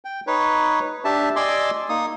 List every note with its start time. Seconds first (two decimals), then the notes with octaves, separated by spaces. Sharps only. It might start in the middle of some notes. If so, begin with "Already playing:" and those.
0.05 G5
0.27 D#4 B4 C#5
1.05 D4 G4 E5 A5
1.36 D5 D#5 G#5 C6 D6 E6
1.89 A#3 D#4 D#6